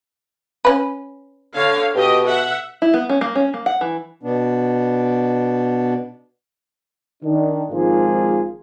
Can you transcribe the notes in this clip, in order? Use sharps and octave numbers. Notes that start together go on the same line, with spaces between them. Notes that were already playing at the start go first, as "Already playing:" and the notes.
C#4 B4
D3 C#5 F5
B2 G4 D#5
E5 F#5
E4
B3
C#4
A#3
C#4
A#3
F#5
E3
B2 B3 D4
D#3 D4
G#1 G#2 F3 A#3 F4 G#4